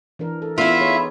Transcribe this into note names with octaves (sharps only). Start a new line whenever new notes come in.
E3 D4 A#4
A4
B3 E4 F4 E5
D#4 G#4 C#5